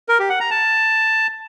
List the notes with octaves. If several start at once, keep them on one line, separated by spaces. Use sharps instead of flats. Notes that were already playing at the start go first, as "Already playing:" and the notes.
A#4
G4
F#5
A#5
A5